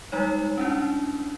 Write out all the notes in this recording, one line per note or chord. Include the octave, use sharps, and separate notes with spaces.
G3 G#3 D#4 C#5
C#4 D4 E4